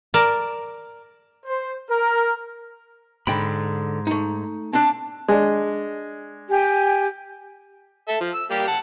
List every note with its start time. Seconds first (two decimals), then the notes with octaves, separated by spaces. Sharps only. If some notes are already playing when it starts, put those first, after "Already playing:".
0.14 A#4 D5 A5
1.46 C5
1.90 A#4
3.27 G#2 D3 G5 B5
4.07 A3 D#4
4.73 C4 D4 A5
5.28 G#3 D4
6.49 G4 G5 G#5
8.08 A4 E5
8.20 F3
8.34 E6
8.50 G3 A#3 G4
8.68 F#5 A5